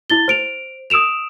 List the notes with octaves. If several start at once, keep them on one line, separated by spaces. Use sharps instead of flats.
E4 A6 G7
C5 D7 F7
D#6 E6 D7 E7 F7